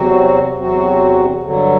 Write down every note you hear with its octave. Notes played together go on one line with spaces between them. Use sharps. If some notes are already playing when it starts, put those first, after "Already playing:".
Already playing: E2 C3 F#3 C4 F#4
E2 C3 F#3 C4 F#4
G2 D3 F#3